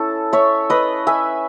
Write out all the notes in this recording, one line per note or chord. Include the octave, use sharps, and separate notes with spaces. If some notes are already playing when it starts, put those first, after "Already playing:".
Already playing: C#4 E4 A4
C#5 E5
B4 D#5
E5 G#5